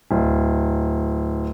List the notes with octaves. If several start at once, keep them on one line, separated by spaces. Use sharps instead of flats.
D1